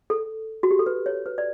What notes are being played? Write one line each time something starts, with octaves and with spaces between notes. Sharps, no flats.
A4
F#4
G4
A4
B4
C#5
B4
D5